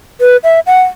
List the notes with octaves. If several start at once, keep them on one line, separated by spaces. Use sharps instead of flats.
B4
E5
F#5